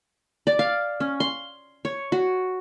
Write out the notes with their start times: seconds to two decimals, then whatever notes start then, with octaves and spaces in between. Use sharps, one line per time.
0.47 D5
0.59 F5
1.00 C#4
1.20 C6
1.85 C#5
2.12 F#4